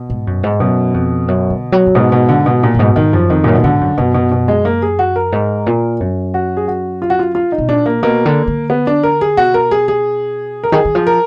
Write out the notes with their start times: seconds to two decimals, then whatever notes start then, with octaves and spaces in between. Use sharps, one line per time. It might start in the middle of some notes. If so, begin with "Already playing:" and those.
Already playing: B2
0.10 G#2
0.27 F#2
0.43 G#2
0.60 F#2 B2
0.94 F2
1.28 F#2
1.50 D3
1.72 F#3
1.86 F#2
1.95 G#2 B2
2.12 B2
2.29 D3
2.46 B2
2.63 A#2
2.74 F#2
2.79 G#2 B2
2.96 G#2 D#3
3.13 F#2 F3
3.30 F2 D#3
3.44 F#2 A#2
3.54 B2
3.64 G#2 D3
3.81 F#2
3.98 F#2 B2
4.14 B2
4.32 B2
4.48 G#3
4.65 A#3
4.82 G#4
4.99 F#4
5.16 A#4
5.32 G#2
5.66 A#2
6.00 F#2
6.34 F#4
6.57 G#4
6.68 F#4
7.02 F4
7.10 F#4
7.19 F4
7.35 F4
7.52 D#4
7.58 B2
7.69 A#2 D4
7.86 A#3
8.03 B2 A#3
8.25 D3
8.48 D3
8.70 B3
8.87 D4
9.03 A#4
9.21 G#4
9.37 B2 F#4
9.54 A#4
9.71 G#4
9.88 G#4
10.64 A#4
10.72 D#3 G#4
10.85 D#3
10.95 F3
11.07 A#4